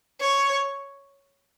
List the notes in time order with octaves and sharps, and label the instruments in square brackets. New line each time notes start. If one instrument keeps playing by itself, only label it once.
[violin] C#5